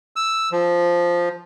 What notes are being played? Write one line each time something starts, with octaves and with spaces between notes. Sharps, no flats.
E6
F3